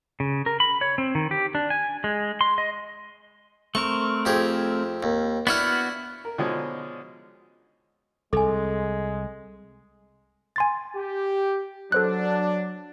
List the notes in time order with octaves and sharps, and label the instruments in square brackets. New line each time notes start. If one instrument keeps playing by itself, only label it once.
[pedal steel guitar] C#3
A#4
B5
C#5
C4
D#3
G4
D4
G#5
G#3
C6
D#5
[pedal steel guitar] A3 C4 A#4 [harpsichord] C#6
[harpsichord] F2 G4 G#4
D#2
[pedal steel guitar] B3 F#4 F6 [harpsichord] D4 E4 F#5
[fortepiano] A#4
B2 D3 F3 G#3 C#4 D#4
[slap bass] C2 [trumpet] G#3 [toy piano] A4 G#5
[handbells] G#5 C6 A6
[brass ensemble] G4
[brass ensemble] F#3 D4 [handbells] A4 C5 F#6